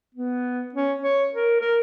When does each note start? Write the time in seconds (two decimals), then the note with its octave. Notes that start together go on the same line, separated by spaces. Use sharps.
0.14 B3
0.74 C#4
1.03 C#5
1.34 A#4
1.61 A#4